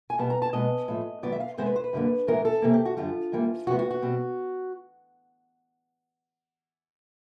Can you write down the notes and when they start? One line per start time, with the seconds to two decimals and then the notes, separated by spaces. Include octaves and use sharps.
0.10 G#5
0.18 B2 G3 B3 A5
0.30 A#5
0.42 A5
0.53 B2 G#3 B3 D#5
0.88 A2 F3 A3
1.23 G#2 D#3 F#3 B3 D5
1.32 E5
1.40 F5
1.57 E2 C3 E3 G#3 B3 C5
1.66 B4
1.76 C5
1.84 B4
1.93 F#2 D3 G3 A#3
2.27 A2 E3 G#3 B3 A#4
2.45 A4
2.62 C3 E3 G3 A#3
2.73 G4
2.85 F#4
2.97 F#2 D3 G3 F4
3.32 G#2 E3 G3 A#3
3.67 E2 C3 F3 G#3 B3 F#4
3.79 F#4
3.91 F#4
4.02 B2 G3 C4